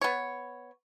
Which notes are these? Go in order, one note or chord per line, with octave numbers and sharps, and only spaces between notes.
B3 C#5